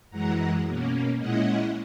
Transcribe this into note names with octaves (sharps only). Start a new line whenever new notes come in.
F#2 E3 G#3 F#5 A#5
B2 A#3 C#4
A#2 G#3 C#4 E4 D#5 F#5